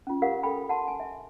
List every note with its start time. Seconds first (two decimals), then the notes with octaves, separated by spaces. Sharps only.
0.07 C#4 F4
0.22 G4 A#4 F5 F#5
0.43 A4 G5 B5
0.69 F#5 A5 C6
0.88 G#5
1.00 E5